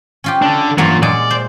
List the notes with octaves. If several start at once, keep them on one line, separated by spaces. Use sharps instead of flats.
C#4 F4 G4
D4 A4
G2 E3 F#3 A#3 F4
A#2 G#3 F4 D5
C5